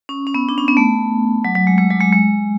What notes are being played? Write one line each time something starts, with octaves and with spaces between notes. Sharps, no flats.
C#4
C#4
B3
D4
C#4
B3
A3
F#3
F#3
G#3
G#3
F#3
G#3
G#3